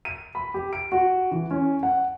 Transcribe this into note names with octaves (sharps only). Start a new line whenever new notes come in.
D#7
B5
G4
D7
F#4
E3
C#4
F#5